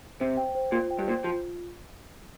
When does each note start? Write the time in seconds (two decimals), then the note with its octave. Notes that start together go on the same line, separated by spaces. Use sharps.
0.20 C3 C5
0.37 G5
0.55 C5
0.72 A#2 F4
0.91 G5
0.99 G2
1.08 A#2 C5
1.24 F3 F4